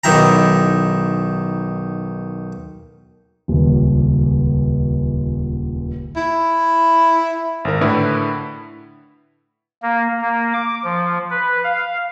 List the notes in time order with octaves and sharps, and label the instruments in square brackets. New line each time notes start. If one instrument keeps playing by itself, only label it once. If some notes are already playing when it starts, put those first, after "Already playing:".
[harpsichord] B1 D#3 E4 G5 A#5
[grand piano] D#1 C#2
[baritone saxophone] E4
[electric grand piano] G#1 A#4
A2 D3 E4 B4
[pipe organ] A#3
A#3
D6
F3
B4
F5